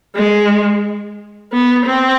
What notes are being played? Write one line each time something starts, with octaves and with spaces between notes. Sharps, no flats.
G#3
B3
C4